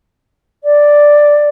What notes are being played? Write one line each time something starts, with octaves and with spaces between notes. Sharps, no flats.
D5